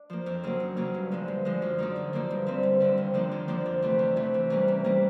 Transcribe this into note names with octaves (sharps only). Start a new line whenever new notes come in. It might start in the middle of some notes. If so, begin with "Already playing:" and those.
Already playing: D4
F3 A#3
F2
C#3 F#3 A#3
F2
C#3 F#3 A#3
G2
D3 F3 G#3
G2
D3 F3 G#3
F#2
D3 F3 A#3 D#4
F#2
D3 F3 A#3 D#4
G2
D3 G3 C4
G2
D3 G3 C4
D#2
D3 F3 A#3 D4
D#2
D3 F3 A#3 D4
F2
C3 E3 A3
F2
C3 E3 A3
C3
E3 G3 A#3 C#4
C3
E3 G3 A#3 C#4